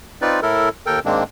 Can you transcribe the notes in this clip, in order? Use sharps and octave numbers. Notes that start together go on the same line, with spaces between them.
C4 D#4 F4 B4 D5
A2 E4 A4 A#4
D#2 A4 A#4 G5
G#2 D#3 G#3 A#3 C4 D4